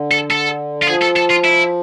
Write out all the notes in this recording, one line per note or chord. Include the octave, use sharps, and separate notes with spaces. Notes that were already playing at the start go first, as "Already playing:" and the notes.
Already playing: D3
A4
A4
F4
F3 G#4
A4
A4
F4
E4